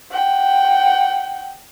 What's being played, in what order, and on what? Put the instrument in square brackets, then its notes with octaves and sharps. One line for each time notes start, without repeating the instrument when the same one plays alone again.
[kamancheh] F#5 G5